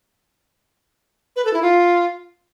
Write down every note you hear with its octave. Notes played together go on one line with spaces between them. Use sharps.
B4
A4
E4
F4